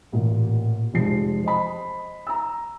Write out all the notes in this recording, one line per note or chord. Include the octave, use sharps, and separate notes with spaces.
A1 A#2
F1 F3 G#3 C7
C5 D#5 B5
A#5 E6